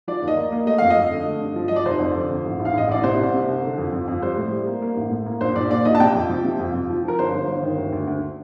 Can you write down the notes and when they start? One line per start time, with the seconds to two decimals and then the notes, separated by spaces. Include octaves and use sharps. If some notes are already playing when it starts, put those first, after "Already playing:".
0.08 F3 D5
0.22 D#2
0.28 D#5
0.37 A#3
0.52 A#3
0.66 A3 D#5
0.78 F2 F5
0.90 D#5
0.97 F2
1.11 D3
1.26 A3
1.41 G2
1.56 F3
1.68 F3 D#5
1.76 D5
1.86 F1 C5
2.00 F2
2.16 D3
2.30 F2
2.45 A1
2.59 A1
2.65 F5
2.74 A1 D#5
2.89 A1 D5
3.04 C3 C5
3.19 C2
3.34 C3
3.48 C2
3.63 D3
3.78 F2
3.92 F2
4.08 F2
4.22 G3 C5
4.37 A2
4.52 G3
4.67 A#3
4.82 A#3
4.96 A1
5.11 A2
5.26 A#3
5.41 A#1 C5
5.56 A#1 D5
5.71 A#2 D5
5.85 A#1 D#5
5.95 A5
6.00 C3 G5
6.15 F2
6.29 F3
6.44 C3
6.59 F2
6.74 F2
6.89 F3
7.04 F3 A#4
7.19 G1 C5
7.34 G1
7.48 G1
7.63 D#3
7.78 D2
7.92 D2
8.07 D2